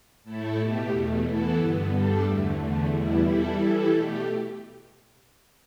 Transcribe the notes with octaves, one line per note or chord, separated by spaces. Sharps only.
A2 A3 E4 A4
B2 A3 G4
E2 B2 A3
E3 B3 E4 A4
G2 D3 B3
G2 G3 D4 A4
E2 D3 A3
E2 D3 A3
E2 B2 G3 E4
E3 G3 E4 A4
E3 G3 E4 A4
B2 A3 G4